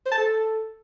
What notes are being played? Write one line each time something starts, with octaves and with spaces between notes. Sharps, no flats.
C5
A5
A4